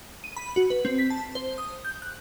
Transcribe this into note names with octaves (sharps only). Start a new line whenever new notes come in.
D#7
B5
F#4
B4
C4
B6
A5
C5
D#6
G6
F#6